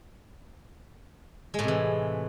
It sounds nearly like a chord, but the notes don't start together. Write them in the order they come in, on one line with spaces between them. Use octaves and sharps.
G#3 A2 C3 E3